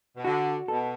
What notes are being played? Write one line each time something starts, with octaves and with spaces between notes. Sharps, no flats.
B2
D3 F#4
B2 A4